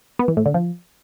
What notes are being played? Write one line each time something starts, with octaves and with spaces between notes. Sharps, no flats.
B3
E3
A2
D3
F3